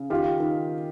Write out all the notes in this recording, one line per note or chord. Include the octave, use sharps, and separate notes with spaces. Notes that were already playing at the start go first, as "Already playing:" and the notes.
Already playing: C#3
D#3 F4 G4
D#3